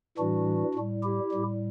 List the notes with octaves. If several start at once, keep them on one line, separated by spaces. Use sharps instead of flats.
A2 E3 G3 D4 F#4
A2 G3
E4 G4
A2 G3